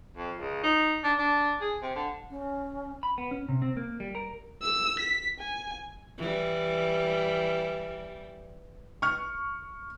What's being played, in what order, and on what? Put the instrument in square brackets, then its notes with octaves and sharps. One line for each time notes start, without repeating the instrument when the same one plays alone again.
[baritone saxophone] F2
C#2
D#4
D4
D4
G#4
C3
D3
[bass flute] C#4
[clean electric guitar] B5
B3
C#4
C3
C4
A#3
G3
A#4
[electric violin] E6
B6
G#5
[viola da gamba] E3 G3
[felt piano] C#6 F6